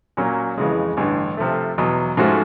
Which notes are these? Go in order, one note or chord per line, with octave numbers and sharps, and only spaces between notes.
A#2 F#3 A#3 C#4
F2 C#3 E3 G#3
A1 G2 D3
C3 F3 A3
E2 B2 F#3
G#2 F3 A3 C#4 F#4